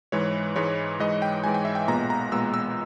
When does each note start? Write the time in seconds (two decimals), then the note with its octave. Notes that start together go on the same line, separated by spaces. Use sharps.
0.12 G#2 E3 G#3 C#5
0.56 G#2 E3 G#3 C#5
1.00 G#2 E3 G#3 D#5
1.22 G5
1.44 G#2 E3 G#3 G#5
1.54 G5
1.65 E5
1.75 G5
1.88 B1 A#2 G#3 B3 A#5
2.10 A#5
2.32 B1 A#2 G#3 B3 E6
2.54 E6